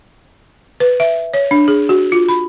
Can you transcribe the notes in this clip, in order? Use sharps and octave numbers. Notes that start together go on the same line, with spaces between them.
B4
E5
C#5
D4
G#4
F#4
F4
B5